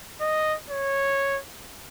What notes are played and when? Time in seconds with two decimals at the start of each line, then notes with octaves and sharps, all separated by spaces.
0.21 D#5
0.70 C#5